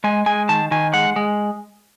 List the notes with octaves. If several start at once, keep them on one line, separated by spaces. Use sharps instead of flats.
G#3 G#5
G#3 G#5
D#3 A5
D#3 G#5
G#3 F#5
G#3